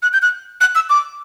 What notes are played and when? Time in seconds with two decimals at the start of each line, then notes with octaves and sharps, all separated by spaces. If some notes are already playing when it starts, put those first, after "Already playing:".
0.03 F#6
0.13 G6
0.22 F#6
0.61 F#6
0.75 E6
0.90 D6